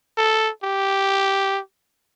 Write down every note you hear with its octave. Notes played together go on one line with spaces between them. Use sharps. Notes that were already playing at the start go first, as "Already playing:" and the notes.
A4
G4